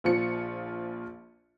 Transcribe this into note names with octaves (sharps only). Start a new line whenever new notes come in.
A#1 F3 C#7